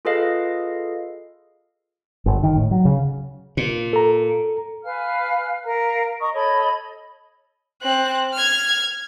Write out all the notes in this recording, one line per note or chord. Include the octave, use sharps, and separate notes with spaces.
F4 G#4 A4 B4 D#5 F5
G1
D#3
A2
F#3
C#3
A#2
A4 A#5
B4 F5 G#5 F6
A#4 E5 F5 A#5
D#5 A#5 C#6 D#6
A4 C#5 D#5 B5
C4 F#6
F6 G#6